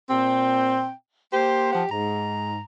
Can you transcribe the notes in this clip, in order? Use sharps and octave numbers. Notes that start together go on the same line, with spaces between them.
A#2 C4 G5
A#3 G4 C5
F3 C5 F#5
G#2 A#5